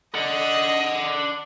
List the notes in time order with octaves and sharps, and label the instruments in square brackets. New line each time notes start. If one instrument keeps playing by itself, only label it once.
[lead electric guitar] D5 F#5 [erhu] D#5